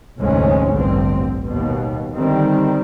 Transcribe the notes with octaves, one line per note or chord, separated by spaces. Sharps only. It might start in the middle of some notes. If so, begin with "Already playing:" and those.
F1 D2 G#2 G#3 C#4
A1 G2 D3 C4
D#2 B2
D3 D#3 G3 C4